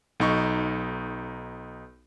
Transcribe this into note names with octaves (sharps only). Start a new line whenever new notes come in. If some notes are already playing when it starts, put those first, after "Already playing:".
B1 D#4 C#6